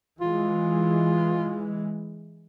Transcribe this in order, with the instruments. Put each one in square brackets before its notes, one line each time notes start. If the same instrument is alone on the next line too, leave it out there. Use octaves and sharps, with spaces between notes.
[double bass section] E3 G#3 [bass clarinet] F4